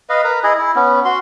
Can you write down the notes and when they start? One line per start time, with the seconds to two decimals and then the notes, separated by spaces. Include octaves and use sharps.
0.10 B4 D#5 F5
0.24 A#4 B4
0.44 E4 G#4 D#5
0.58 E4
0.76 B3 C#4
1.05 F#4 C6